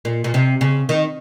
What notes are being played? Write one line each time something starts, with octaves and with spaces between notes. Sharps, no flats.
A#2
A#2
C3
C#3
D#3